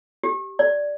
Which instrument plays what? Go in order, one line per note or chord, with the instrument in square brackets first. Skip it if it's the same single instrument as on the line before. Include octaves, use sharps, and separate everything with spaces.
[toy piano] G4
D5